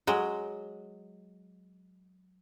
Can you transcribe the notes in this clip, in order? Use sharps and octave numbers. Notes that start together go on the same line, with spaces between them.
F#3 G#3